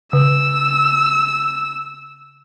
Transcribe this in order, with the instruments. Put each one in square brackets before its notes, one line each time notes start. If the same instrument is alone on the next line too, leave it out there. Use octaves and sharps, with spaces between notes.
[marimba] C#3 [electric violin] E6